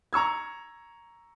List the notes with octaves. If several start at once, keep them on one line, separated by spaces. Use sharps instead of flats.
A#5 C#6 E6 G#6